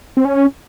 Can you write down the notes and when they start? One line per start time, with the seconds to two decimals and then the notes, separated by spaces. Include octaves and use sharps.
0.17 C4
0.25 C#4